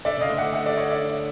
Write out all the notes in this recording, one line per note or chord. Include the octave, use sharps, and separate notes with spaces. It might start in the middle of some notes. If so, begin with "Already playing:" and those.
D3 D5 E5
C#3 D#5 F5
D2 D3
E5 F#5
E5 F#5
D5 E5
C#5 D#5
D5 E5